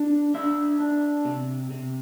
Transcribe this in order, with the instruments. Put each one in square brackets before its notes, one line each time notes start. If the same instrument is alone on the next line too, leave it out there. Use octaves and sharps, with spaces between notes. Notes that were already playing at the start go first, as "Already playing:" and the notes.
Already playing: [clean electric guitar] D4
D4 E5
D4
C3
C3